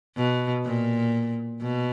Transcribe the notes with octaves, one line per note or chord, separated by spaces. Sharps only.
B2
A#2
B2